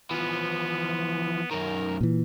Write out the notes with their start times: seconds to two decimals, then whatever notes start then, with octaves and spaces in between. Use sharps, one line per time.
0.11 E3 F3 B3
1.51 F#2 D#3 A#4
2.01 A#2 E3